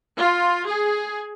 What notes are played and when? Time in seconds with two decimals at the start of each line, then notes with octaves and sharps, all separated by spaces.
0.18 F4
0.67 G#4